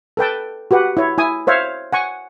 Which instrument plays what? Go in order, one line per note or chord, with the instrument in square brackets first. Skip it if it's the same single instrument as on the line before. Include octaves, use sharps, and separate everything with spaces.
[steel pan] A4 B4 G5 A5
F#4 G4 B4 F#5
E4 C#5
E4 G#5 D#6
C5 C#5 E5 F5
F#5 G#5 C#6